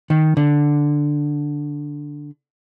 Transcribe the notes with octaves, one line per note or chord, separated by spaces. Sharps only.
D#3
D3